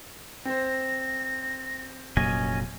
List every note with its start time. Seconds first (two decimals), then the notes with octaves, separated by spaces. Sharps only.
0.45 C4 C5 A#6
2.17 F1 A#2 F#3 C#4 D#5 G#5